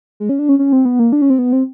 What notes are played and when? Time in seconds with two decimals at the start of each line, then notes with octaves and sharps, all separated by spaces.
0.20 G#3
0.29 C#4
0.39 D4
0.49 C#4
0.59 C#4
0.73 C4
0.85 B3
0.99 A#3
1.12 D4
1.22 C#4
1.30 C4
1.39 B3
1.53 C4